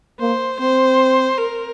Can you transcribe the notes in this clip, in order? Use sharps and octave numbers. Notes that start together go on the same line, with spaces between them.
A#3 C5
C4 C5
A#4